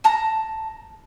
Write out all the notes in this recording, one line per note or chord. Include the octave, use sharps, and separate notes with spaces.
A5 A#5